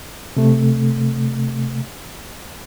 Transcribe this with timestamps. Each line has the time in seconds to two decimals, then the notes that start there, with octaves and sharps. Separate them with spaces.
0.37 C3 A3